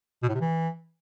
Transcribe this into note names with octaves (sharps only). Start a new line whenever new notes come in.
B2
A2
C3
E3